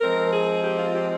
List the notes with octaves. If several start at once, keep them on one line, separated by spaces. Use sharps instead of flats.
F3 G#3 C4 A#4
G#4
G4
F4
G4